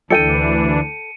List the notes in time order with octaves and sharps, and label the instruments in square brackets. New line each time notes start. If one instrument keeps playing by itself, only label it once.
[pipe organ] D2 E3 D4 [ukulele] A4 G5 [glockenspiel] C#7 D#7